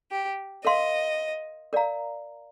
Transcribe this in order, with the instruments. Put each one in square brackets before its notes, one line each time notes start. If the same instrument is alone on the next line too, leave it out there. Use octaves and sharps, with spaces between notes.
[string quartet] G4
[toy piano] A#4 F5 C6 [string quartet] D#5
[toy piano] A#4 D5 F5 A#5